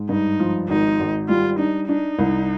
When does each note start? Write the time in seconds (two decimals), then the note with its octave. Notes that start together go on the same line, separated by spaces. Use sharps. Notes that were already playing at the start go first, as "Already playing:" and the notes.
Already playing: G#2
0.09 G2 D#4
0.40 F3
0.69 G#1 D#4
1.00 G#1
1.29 G3 F4
1.59 D4 D#4
1.88 D4 D#4
2.19 C2